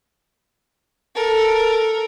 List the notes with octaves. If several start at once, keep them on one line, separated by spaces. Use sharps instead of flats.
A4 A#4